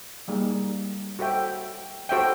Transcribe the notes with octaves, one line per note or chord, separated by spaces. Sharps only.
G3 A#3 D#4 G#4
F#4 A4 C5 E5 G5
F#4 A4 C5 E5 G5